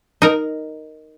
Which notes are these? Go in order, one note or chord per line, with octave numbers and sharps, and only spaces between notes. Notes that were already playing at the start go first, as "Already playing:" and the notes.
D#4 A#4